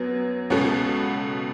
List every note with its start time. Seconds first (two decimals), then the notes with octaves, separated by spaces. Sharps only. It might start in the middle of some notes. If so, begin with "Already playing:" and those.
Already playing: F#2 F#3 B3
0.50 C#2 B2 B3 C#4 F#4 A4